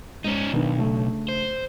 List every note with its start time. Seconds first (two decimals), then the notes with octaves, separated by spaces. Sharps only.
0.24 G#2 C#4 D#4
0.53 B1 D#3 B3 D4
0.78 C#3 A3 D4
1.29 C5